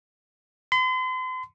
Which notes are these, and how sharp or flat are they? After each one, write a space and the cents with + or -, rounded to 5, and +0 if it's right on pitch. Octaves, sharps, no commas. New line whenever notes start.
C6 -40